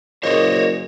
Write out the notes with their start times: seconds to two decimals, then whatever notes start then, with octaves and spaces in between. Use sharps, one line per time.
0.23 F#1 A#2 C5 C#5 D#5